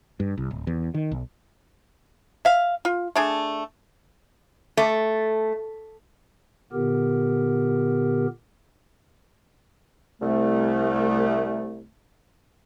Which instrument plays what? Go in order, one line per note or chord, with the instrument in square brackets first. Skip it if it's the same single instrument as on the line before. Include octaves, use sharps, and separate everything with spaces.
[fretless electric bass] G2
C2
D1
E2
D#3
B1
[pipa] E5 F5
F4
A3 D4 G#4
[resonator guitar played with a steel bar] A3
[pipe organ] A#2 D3 B3 G4 A#4
[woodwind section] C2 A3